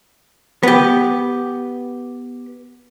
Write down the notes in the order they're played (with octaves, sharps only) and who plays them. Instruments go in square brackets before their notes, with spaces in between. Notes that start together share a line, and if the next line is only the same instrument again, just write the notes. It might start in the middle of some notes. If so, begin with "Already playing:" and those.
[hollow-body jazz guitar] B3 G4